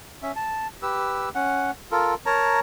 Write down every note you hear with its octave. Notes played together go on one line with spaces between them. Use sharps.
C#4 E5
A5
G4 B4 E6
C#4 F#5
F4 A4 A#4
A#4 C#5 A5 A#5